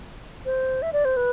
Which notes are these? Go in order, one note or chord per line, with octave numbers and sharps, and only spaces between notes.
C5
E5
D5
C5
B4